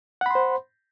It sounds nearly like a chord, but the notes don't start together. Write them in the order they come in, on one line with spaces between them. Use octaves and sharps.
F#5 B5 C6 C5